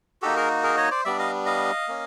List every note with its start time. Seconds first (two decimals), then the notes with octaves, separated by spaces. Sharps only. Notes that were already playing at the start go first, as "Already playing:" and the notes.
0.22 A#3 D#4 F#4 G4 A4
0.36 G#4 A#4
0.63 G#4 A#4
0.77 C#5 D#5
0.91 C5 D5
1.04 G3 B3 D4 D5 E5
1.19 D#5 F5
1.46 D#5 F5
1.88 A#3 C#4